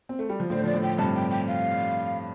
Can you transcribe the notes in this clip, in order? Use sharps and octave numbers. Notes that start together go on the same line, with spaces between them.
C4
A3
G3
F3
A2 D3 C5
F3 D5
A2 D3
G5
G2 C3 A5
G5
G5
F5